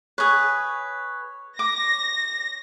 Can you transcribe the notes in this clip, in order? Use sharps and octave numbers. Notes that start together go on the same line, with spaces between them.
G#4 B4 C#5
D6 A#6